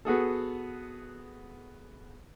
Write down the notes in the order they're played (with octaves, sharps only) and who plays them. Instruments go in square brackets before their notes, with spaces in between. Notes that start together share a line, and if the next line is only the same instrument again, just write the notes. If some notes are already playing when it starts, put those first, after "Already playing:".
[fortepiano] B3 F#4 G#4 A4